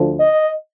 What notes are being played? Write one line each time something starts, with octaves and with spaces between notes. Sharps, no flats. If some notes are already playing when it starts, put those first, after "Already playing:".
Already playing: D2 D3 F3
D#5